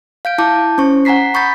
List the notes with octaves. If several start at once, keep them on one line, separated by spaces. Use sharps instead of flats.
F5 G6 D7
E4 A5 D6 G6
C#4 C5 C#6
F#5 G#5 A#5 B6 C7
B5 C#6 D#6 G6 A6 B6